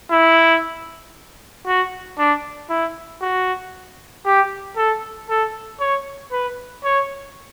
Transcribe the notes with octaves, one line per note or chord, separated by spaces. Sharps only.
E4
F#4
D4
E4
F#4
G4
A4
A4
C#5
B4
C#5